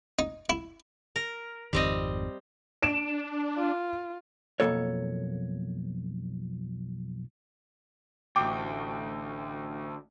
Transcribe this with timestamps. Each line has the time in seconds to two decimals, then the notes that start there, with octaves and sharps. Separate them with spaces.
0.19 D#4
0.50 E4
1.16 A#4
1.73 G#1 F2 D#3 G3 C4 D#5
2.82 D4 D7 E7
3.58 F4
4.60 B1 F2 B2 A#3 A4 C#5
8.36 A1 D2 G5 D6